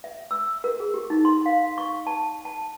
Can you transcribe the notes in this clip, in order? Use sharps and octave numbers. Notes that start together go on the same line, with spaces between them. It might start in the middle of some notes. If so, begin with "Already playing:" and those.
E5
E6
A#4
G#4
G4
D#4
C6
F5
C#6
A5
A5